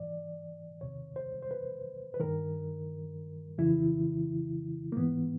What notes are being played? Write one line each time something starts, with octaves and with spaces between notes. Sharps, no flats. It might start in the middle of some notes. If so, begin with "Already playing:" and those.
Already playing: G#2 E3 D5
E2 C3 D#3 C#5
C5
C5
B4
B4
G2 D#3 A#4
F2 C#3 E3 E4
A#3
G#2 E3 B3